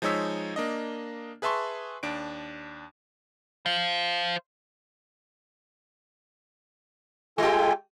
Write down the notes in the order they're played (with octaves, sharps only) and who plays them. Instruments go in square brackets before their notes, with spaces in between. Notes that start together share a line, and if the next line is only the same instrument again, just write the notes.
[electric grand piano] F3 G#3 D#4 C#5 E6 B6
A#3 D4 D#5
G#4 B4 E5 A5 C6 C#6
D#2 D4 D7
[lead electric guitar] C5 F5
[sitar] G#3 G4 [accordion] F4 A4 G#5